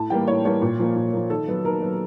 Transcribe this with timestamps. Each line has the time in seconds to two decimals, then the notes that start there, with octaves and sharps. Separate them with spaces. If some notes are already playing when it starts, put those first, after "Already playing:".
Already playing: A2 A5
0.10 E3 G3 A#3 G5
0.28 A2 C#5
0.45 E3 G3 A#3 C#5
0.62 A#2
0.79 F3 A#3
0.96 A#2
1.13 F3 A#3
1.30 D#3 A4
1.47 F#3 B3
1.65 D#3 A#4
1.82 F#3 B3